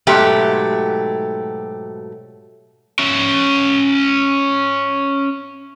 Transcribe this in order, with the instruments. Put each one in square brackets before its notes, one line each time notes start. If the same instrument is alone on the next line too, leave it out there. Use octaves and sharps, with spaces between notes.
[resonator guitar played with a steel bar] G#2 B2 F#3 A3 G4
[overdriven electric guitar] C#4 E5